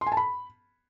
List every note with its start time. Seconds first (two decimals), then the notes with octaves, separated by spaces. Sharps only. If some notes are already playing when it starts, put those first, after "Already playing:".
0.01 C6
0.07 G#5
0.12 A5
0.17 B5